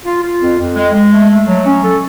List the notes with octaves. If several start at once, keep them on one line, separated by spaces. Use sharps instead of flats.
F4
F4
F2
F2
G#3
G#3
A3
A3
F#3
C#4
A4